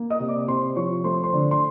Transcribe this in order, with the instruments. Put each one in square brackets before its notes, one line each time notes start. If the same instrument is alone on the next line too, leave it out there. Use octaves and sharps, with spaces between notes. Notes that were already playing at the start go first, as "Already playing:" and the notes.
Already playing: [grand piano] A#3
D#5 D#6
C3
D5 D6
C3 C5 C6
F3 C#5 C#6
A3 C5 C6
C5 C6
D3
C6